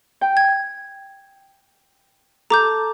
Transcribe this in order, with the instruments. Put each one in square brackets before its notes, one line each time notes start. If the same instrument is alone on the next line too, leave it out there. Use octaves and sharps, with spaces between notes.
[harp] G5
[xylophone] G#6
[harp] A4 [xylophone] A#5 D6 G6